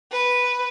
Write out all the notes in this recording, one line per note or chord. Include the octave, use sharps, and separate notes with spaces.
B4